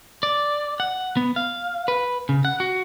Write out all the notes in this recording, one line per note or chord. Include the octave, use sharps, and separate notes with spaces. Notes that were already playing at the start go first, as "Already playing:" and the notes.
D5
F#5
B3
F5
B4
C#3
F#5
F#4